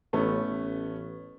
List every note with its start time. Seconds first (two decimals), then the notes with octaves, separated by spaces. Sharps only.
0.13 A1 A3 B3 C#4
0.47 A1